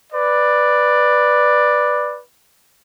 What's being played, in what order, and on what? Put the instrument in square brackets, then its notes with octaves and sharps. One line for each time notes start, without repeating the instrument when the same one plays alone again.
[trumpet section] B4 D5